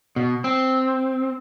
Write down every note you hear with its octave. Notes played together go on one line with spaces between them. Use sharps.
B2
C4